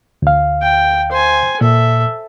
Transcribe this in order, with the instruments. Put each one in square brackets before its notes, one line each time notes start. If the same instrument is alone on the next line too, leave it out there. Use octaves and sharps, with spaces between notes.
[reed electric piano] D2 F5
[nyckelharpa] G5
C5 G#5
[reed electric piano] A#2 [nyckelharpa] A4 E5